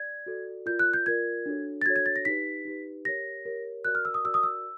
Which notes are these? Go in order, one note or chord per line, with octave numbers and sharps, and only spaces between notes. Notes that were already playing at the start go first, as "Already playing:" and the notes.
Already playing: D5 G#6
F#4 A4 D5
F4 A#4 D5 G6
F#6
G6
F4 A#4 D5 G#6
D4 F#4 A4 C#5
A6
D4 F#4 A4 C#5 G#6
G#6
A6
A#6
D#4 G4 B4 B6
D#4 G4 B4
G4 A#4 C#5 A#6
G4 A#4 C#5
F#4 A#4 D5 F#6
F6
E6
D#6
F#4 A#4 D5 E6
D#6
E6